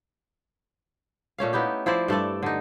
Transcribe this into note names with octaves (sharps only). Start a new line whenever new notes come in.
A#2 A3 C#4 F5
B3 D#4 E4 G4
F3 E4 C5 D5
G2 A3 A4 D5
D3 D#4